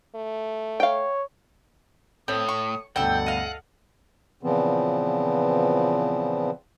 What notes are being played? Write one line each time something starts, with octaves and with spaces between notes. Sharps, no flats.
A3
C#5 F5 G5
A2 C4 A4 C#5 D#6
C#6
D2 G2 B2 A4 F#5 G5 E6
D#5 F5
A#2 C#3 E3 F3 B3 C4